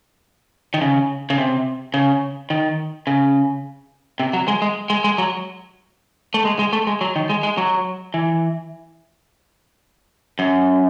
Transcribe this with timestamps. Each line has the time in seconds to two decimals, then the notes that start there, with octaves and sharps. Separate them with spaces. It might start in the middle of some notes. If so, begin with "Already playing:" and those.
0.74 D#3
0.81 C#3
1.30 C#3
1.38 C3
1.94 C#3
2.50 D#3
3.07 C#3
4.20 C3
4.33 F#3
4.48 G#3
4.62 G#3
4.90 G#3
5.04 G#3
5.18 F#3
6.34 A3
6.45 G#3
6.59 G#3
6.73 A3
6.87 G#3
7.01 F#3
7.16 D#3
7.30 G#3
7.43 G#3
7.58 F#3
8.14 E3
10.39 F#2